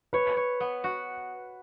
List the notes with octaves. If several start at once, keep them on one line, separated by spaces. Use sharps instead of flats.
B4 C#5
C#5
B3
F#4